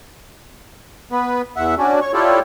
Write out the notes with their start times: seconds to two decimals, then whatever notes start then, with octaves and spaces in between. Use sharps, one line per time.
1.12 B3 B4
1.56 E2 E5 F#5
1.78 C#4 D4 F#4
2.01 C#5 C#6
2.14 E4 F4 G4 A4 C#5 D5